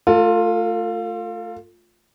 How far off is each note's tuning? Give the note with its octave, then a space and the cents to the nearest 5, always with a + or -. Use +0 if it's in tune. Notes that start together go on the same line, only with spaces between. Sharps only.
A3 +0 F4 +10 A4 +40